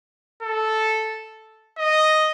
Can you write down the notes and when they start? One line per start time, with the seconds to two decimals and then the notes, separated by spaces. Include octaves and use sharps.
0.43 A4
1.78 D#5